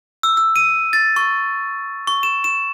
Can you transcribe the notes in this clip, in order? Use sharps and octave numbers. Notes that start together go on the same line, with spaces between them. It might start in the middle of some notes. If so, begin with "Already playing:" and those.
E6
E6
D#7
A6
C#6
C#6
E7
E7